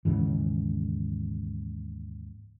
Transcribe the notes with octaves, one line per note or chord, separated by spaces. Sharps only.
D#2 G#2 C#3 E3